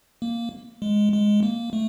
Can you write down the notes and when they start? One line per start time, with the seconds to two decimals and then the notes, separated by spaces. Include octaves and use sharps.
0.22 A#3
0.82 G#3
1.12 G#3
1.43 A#3
1.73 A3